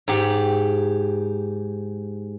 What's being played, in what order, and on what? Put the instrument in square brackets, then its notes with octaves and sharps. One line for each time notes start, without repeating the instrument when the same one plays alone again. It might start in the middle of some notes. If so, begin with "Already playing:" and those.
[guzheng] G#2 G4